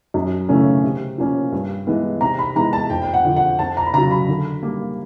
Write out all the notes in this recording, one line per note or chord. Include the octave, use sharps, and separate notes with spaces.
F#2
C#3 E3 A3 C#4
C3
F3 A#3 C#4
G2
E3 G#3 B3
C3 A#5
B5
E3 G#3 B3 A#5
A5
F2 G5
G5
F#5
D3 F3
F#5
F2 A5
A#5
B5
C#3 F#3 A#5
B5
D3
G3 A#3